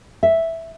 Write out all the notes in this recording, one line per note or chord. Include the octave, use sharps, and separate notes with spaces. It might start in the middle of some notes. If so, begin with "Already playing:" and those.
E5